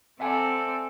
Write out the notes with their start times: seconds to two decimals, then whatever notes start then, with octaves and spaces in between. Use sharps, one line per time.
0.20 C4 A4 D5 E5 F#5 G#5